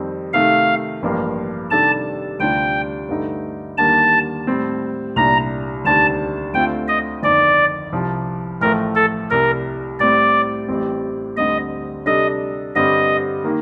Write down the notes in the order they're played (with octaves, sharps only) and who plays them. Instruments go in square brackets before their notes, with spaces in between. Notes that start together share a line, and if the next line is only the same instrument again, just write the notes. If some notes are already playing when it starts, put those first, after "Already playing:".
Already playing: [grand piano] F2 D#3 G3 C4
[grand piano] C3 D#3 A3 [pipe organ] F5
[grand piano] A1 G2 F3 A#3
[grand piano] C3 D#3 G3 D4 A4 [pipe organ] A5
[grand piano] D2 C3 G3 D4 F4 [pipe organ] G5
[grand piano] G2 D3 A3 D#4
[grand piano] D#2 D3 G3 A#3 [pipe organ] A5
[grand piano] A2 G3 C4
[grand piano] C2 A#2 G3 D4 [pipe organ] A#5
[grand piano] D2 C3 D#3 G3 D4 [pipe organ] A5
[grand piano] D2 D3 A3 C4 F4 [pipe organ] G5
[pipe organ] D#5
[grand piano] G1 F2 D#3 [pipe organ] D5
[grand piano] C2 C3 F3
[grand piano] A1 A2 F3 A3 [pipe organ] A#4
[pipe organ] A4
[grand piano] C2 C3 G3 [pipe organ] A#4
[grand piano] A2 G3 C4 [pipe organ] D5
[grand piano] A1 A2 G3 C4 G4
[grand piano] D2 D3 G3 C4 [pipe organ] D#5
[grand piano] C3 G3 D4 A4 [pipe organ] D#5
[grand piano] G2 D3 G3 C4 [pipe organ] D#5
[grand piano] D#3 A#3